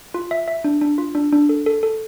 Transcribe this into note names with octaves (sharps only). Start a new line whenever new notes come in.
F4
E5
E5
D4
D4
F4
D4
D4
A4
A4
A4